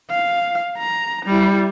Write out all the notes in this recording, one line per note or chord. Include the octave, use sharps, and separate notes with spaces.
F5
A#5
G3 E4